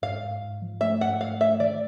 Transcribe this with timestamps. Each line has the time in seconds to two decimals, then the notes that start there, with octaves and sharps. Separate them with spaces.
0.02 G#2 F5
0.23 G#2
0.41 G#2
0.62 F3
0.81 A3 E5
1.01 G#2 F#5
1.21 G#2 F5
1.40 A3 E5
1.60 D#3 D5